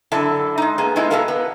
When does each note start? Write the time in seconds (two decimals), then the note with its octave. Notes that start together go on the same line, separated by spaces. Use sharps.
0.12 F#2 D3 E4 A4 A5
0.58 G#3 D#4
0.78 A#3 B3 G#4
0.96 G#3 B3 D#4 E4
1.10 B2 E4 F#4 A4 A#4 F5
1.28 B3